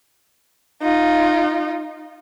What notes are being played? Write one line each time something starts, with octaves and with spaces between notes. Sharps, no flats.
D#4 F4